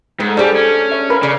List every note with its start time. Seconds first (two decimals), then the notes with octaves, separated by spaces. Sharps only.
0.20 G#2 A3 C4
0.37 G3 A3 D4 G4 G#4 D5
0.56 C#4
0.92 C#5 E5
1.10 A#4 B4 B5
1.23 C#3 D5